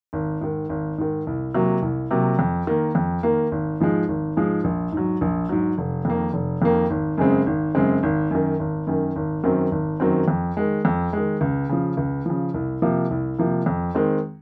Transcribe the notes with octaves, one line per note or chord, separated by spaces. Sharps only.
G#1
G#2 D#3
G#1
G#2 D#3
C2
C3 F#3 A#3
C2
C3 F#3 A#3
F2
D#3 A#3
F2
D#3 A#3
G#1
G#2 F3 G#3
G#1
G#2 F3 G#3
A#1
G#2 F#3
A#1
G#2 F#3
F1
F2 D#3 A#3
F1
F2 D#3 A#3
G#1
F#2 C#3 G#3 C4
G#1
F#2 C#3 G#3 C4
G#1
F#2 D#3
G#1
F#2 D#3
G#1
F#2 D#3 F#3 C4
G#1
F#2 D#3 F#3 C4
F2
D#3 G#3
F2
D#3 G#3
C#2
C#3 F3
C#2
C#3 F3
C2
C3 F3 A#3
C2
C3 F3 A#3
F2
D#3 G#3 C4